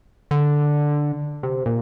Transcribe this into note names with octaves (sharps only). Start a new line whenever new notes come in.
D3
C3
A#2